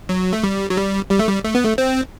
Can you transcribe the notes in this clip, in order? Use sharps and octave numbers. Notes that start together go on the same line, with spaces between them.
F#3
A3
G3
F#3
G3
G3
A3
G3
A3
B3
A3
C4